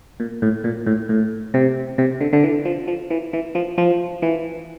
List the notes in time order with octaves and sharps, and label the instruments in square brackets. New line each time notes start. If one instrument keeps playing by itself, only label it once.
[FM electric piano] A#2
A2
A#2
A2
A2
C3
C3
D3
D3
E3
F3
F3
E3
E3
F3
F3
E3